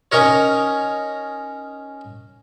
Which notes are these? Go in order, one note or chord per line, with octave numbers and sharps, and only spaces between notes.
C#4 D#4 A#4 C#5